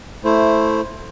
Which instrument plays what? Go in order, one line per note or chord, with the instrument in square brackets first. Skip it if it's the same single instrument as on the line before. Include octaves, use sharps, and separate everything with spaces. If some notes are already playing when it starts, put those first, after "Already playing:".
[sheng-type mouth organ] A3 E4 C5